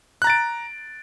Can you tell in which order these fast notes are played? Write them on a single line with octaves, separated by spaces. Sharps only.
F#6 A#5 A6 D7